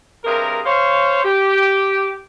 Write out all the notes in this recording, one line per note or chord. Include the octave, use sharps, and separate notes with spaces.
G2 C3 G#4 A#4
C5 C#5 F5
G4